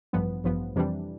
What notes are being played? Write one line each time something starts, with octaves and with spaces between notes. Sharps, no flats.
A1 G2 F3 B3
A1 G2 F3 B3
F2 C3 E3 G3 D4